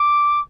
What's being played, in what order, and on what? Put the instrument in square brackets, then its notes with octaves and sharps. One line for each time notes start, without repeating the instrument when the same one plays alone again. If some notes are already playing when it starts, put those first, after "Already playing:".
Already playing: [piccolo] D6